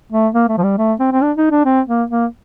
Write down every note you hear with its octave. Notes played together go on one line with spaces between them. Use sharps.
A3
A#3
A3
F3
G3
A3
C4
C4
D4
D#4
D4
C4
A#3
A#3